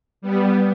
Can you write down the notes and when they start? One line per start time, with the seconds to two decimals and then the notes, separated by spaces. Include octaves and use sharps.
0.22 G3 B3